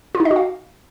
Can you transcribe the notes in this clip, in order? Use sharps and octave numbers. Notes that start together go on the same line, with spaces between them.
F4
D#4
D#5
F#4
F5